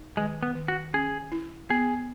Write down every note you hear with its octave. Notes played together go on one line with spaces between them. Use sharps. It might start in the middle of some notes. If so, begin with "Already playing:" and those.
Already playing: D#4
D#3 G#3
B3
D#3
F#4
C#4 G#4
E4
B3 G#4